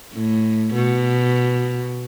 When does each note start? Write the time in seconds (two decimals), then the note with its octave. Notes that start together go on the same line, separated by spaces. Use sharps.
0.13 A2
0.74 B2